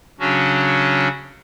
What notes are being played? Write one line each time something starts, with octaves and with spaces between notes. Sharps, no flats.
C#3 F#3 C#4 D4 F#4